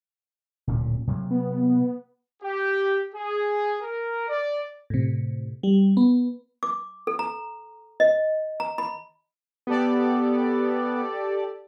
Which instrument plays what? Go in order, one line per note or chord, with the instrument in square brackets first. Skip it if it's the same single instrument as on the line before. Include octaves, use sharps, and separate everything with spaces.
[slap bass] D1 A#2 C#4
C3 F#3 A#3
[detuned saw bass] B3
[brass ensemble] G4
G#4
A#4
D5
[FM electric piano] A2 C3
G3
B3
[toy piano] D6
A4
A#5
D#5
A#5
B5
[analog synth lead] B3 [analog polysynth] G4 A4 D5